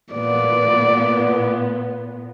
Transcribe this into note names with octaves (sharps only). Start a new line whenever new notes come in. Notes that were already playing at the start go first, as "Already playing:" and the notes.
A#2 B3 D5